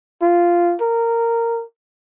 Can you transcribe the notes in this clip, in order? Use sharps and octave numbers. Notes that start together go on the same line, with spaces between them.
F4
A#4